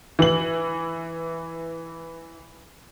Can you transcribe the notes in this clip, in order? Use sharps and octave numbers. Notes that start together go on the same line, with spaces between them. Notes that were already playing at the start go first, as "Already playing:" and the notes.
E3 F#7